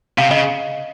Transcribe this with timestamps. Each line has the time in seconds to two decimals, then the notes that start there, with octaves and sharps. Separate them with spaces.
0.18 C3 F5
0.31 C#3 D#5